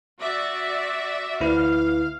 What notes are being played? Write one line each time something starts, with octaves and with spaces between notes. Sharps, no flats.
F#4 D5 E5
D2 E4 B4 F5